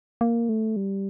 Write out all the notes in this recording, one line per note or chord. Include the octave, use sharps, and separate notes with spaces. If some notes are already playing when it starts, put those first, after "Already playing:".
A#3
A3
G3